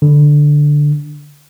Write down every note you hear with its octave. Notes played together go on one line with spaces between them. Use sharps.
D3